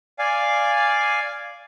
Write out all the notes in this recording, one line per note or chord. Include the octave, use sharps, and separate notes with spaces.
D5 F5 G#5